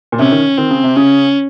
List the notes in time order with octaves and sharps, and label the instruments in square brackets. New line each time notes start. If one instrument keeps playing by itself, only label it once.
[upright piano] A#2
[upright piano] C3 [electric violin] C#4
[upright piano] D#3
[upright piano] D#3 [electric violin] C4
[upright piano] C#3
C3
[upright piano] C#3 [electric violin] C#4